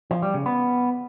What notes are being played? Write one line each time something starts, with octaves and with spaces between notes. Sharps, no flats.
F3
G3
C#3
B3